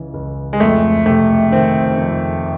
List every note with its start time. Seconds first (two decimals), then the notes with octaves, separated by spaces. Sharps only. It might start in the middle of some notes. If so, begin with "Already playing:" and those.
Already playing: C#2 C#3 E3
0.14 C#2
0.53 G#3
0.60 F2 A3
1.06 C3 A3
1.51 D#3 C4
1.98 F2